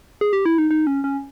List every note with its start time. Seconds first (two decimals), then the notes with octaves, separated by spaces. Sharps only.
0.21 G#4
0.33 G4
0.46 E4
0.58 D#4
0.71 D#4
0.87 C#4
1.04 C#4